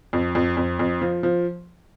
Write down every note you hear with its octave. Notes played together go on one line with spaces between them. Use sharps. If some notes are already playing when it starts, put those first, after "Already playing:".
F2
F2
F2
F2
F3
F3